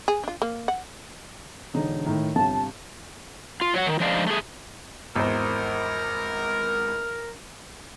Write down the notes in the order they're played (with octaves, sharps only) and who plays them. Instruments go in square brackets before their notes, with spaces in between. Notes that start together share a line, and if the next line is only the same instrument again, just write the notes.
[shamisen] G#4
D4 F4
A#3
F#5
[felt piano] E1 D3 D#4
A2 D#3
[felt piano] G1 C3 [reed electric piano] A5
[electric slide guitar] F4
F#3 C#5 F#5
D#3
F3 G#3 D4 D#4 D5 F5
A3 G#4
[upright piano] G#1 E2 C5 [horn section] A#4